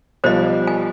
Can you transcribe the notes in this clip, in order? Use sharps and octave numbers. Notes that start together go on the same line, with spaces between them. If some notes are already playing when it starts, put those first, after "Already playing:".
B1 F3 G3 C5 D#5
G#5